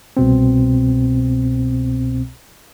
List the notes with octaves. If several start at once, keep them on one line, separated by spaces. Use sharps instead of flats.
C2 B2 C4